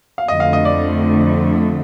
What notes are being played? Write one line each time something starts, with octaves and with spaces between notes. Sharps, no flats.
F5
F2 D3 A3 D#5
F5
D#5
D5